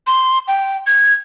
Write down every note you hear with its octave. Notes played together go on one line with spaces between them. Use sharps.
C6
G5
G#6